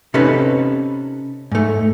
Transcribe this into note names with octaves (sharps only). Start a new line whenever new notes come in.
C3 C#4 D#4 A4 B4
G#2 A3